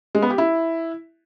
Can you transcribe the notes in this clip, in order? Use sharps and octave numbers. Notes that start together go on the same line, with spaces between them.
G#3
B3
G4
E4